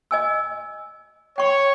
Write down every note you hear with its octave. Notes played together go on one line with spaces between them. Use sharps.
D#5 G#5 E6
C#5 G5 C#6